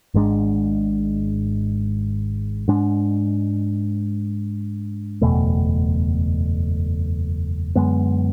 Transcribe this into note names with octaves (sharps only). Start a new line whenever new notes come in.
G#1 G#2 G#3 D4
G#2 G#3 D4
F#1 E2 B2 A3
F#2 D3 G#3 B3